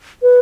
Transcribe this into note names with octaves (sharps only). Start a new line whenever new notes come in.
B4